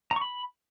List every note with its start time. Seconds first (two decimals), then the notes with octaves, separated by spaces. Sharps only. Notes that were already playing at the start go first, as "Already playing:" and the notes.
0.11 A#5
0.16 C#6
0.21 B5